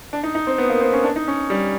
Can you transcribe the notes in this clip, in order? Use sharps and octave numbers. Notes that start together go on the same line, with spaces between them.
D4
D#4
D#4
C4
B3
A#3
C4
C#4
D4
D#4
C#4
G3